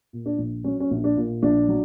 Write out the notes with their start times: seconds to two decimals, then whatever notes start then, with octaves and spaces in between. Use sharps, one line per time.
0.13 A#2
0.26 D4
0.38 A#1
0.64 F#3 C#4
0.80 C#4
0.91 A#1
1.04 D4
1.17 A#2
1.42 A#1 D4
1.69 F#3